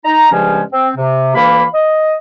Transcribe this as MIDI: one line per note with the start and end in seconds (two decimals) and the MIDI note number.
0.05 0.29 63
0.05 0.29 82
0.31 0.61 43
0.31 0.61 49
0.31 0.61 53
0.31 0.61 56
0.31 0.61 61
0.72 0.89 60
0.96 1.34 48
1.35 1.65 38
1.35 1.65 52
1.35 1.65 58
1.35 1.65 77
1.35 1.65 83
1.74 2.15 75